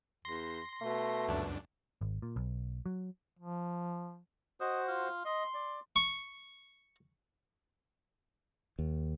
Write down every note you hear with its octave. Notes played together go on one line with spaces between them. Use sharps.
E2 C6 A#6
B2 A3
C#2 F#2 D4
G#1
A#2
B1
F#3
F3
F#4 C5 D#5
F4
D#5 C6
D5
C#6
D#2